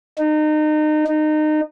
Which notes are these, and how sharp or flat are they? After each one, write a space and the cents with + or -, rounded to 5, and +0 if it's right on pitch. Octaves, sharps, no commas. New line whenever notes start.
D#4 -30
D#4 -25